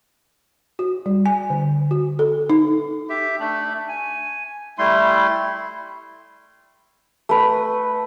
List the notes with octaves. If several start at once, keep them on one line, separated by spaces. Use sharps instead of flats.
F#4
G3
G#5
D3
F#4
A4
D#4
G4 E5
A3 D4
G#5
G3 A3 E4 C6
A3 B4